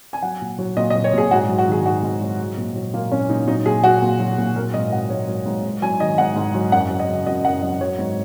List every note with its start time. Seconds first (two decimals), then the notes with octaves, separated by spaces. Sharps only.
0.13 G#5
0.22 F#3 F#5
0.41 A#2
0.59 F#3
0.77 A#2 D#5
0.90 D#5
0.95 F#3
1.04 C#5
1.13 A#2 G#4
1.31 G#2 F#4
1.49 F#3
1.59 F#4
1.67 D#3 G#4
1.85 G#2 F#4
2.03 G#2
2.21 F#3
2.39 F#3
2.57 A#2
2.76 F#3
2.93 A#2 A#3
3.11 F#3 C#4
3.30 A#2 D#4
3.48 F#3 D#4
3.66 A#2 G#4
3.83 F#3 F#4
4.02 A#2
4.20 F#3
4.38 A#2
4.56 F#3 A#4
4.74 G#2 D#5
4.92 F#3 F#5
5.10 G#2 C#5
5.28 F#3
5.46 G#2
5.64 G#2
5.82 F#3 G#5
6.00 D#3 D#5
6.18 G#2 F#5
6.36 G#2
6.54 F#3
6.72 F#2 F#5
6.90 F#3
7.00 D#5
7.08 C#3
7.27 F#2 D#5
7.45 F#2 F#5
7.62 F#3 D#5
7.81 F#3 C#5
7.98 G#2